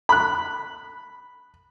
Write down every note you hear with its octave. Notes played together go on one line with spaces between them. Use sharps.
B5 F#6